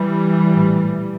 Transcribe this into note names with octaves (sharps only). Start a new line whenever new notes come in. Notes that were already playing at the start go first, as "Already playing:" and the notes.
Already playing: E3 G3
A#1 A2